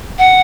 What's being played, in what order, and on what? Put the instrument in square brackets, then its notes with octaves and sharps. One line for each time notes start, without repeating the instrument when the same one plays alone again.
[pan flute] F#5